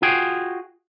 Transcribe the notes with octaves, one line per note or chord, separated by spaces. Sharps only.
F4 F#4 G#4 G5